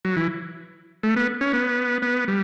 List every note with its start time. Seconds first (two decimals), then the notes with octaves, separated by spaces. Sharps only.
0.05 F#3
0.16 E3
1.03 A3
1.16 B3
1.41 C#4
1.53 B3
2.02 B3
2.28 G3